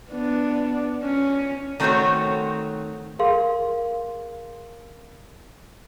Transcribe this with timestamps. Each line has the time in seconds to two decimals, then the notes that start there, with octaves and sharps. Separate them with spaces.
0.10 B3 D4
1.04 C#4
1.80 D#3 A3 C4 D4 F#4 C#5
3.19 G#4 A#4 F5 C6